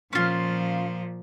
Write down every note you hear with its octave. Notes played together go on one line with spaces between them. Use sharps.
A#2 F3 C#4 F4